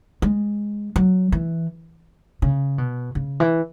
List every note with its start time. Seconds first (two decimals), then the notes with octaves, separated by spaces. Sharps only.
0.22 G#3
0.96 F#3
1.32 E3
2.42 C#3
2.78 B2
3.15 C#3
3.40 E3